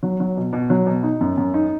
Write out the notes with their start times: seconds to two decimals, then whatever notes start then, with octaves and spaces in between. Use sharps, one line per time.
0.03 F#3
0.20 F#3
0.37 B2
0.53 B2
0.70 F#3
0.86 B2
1.03 D#4
1.21 F#2
1.37 F#2
1.54 D#4